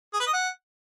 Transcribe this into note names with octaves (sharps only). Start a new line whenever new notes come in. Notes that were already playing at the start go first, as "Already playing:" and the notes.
G#4
B4
D#5
F#5